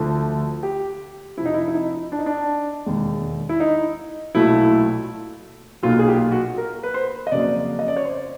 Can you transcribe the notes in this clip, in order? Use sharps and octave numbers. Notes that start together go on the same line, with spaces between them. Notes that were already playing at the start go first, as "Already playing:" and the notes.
Already playing: D2 D3 F3 A3
G4
F2 C3 F3 E4
D#4
E4
E4
D#4
D4
D#4
D4
E1 D#2 D#3 G#3
E4
D#4
B1 A#2 F#3 A3 E4
B1 A#2 F#3 A#3 F4
G#4
G4
F#4
A#4
B4
C5
D#5
F2 C#3 F#3 A#3 D5
D#5
D5
C#5
C5